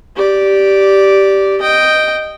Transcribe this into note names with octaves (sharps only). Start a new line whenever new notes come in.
G4 D5
D#5 G5